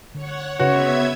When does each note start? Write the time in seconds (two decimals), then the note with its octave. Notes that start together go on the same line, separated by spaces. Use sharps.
0.15 D3 C#5 F#5
0.60 C#3 B3 F#4 B4 C#5 E5 G#6